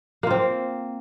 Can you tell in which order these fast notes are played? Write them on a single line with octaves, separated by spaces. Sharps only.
A#3 F4 C4